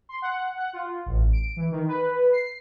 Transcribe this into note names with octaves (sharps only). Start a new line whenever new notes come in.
C6
F#5
F#5
F4
A1
D7
E3
D#3
B4
C7